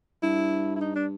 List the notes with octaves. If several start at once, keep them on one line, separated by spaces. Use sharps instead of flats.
G2 E4
E4
D#4
D4